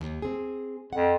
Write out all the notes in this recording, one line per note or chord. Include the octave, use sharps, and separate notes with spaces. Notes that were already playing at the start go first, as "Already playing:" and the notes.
D#2
C4 G#4
F2 F#5